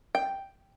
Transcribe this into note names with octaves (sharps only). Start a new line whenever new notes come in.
G5